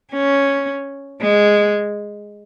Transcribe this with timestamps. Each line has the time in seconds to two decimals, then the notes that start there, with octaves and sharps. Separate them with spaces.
0.12 C#4
1.21 G#3